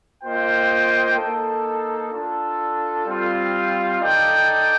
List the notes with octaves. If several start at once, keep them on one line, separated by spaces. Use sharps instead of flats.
A#3 F4 C5 D#5 G5
A#3 D#4 A4
D4 F4 A4
G3 C4 F4
D#4 A4 D5 G5